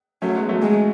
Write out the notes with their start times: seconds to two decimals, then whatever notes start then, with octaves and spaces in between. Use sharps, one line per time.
0.22 F#3 A3 C#4
0.36 G#3 B3
0.49 F#3 A3
0.62 G#3